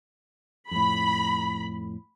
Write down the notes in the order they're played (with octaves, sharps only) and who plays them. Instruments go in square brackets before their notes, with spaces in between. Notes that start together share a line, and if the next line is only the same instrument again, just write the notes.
[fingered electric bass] F2 A2 [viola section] B5